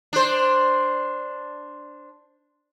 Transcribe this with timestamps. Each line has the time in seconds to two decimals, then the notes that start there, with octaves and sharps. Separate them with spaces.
0.13 D4 C5